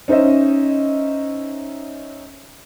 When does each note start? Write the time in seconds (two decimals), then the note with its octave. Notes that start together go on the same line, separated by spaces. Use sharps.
0.08 C#4 D#4 C5 D#5 E5